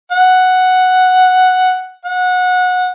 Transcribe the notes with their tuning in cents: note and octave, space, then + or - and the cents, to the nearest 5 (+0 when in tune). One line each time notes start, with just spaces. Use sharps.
F#5 +0
F#5 -20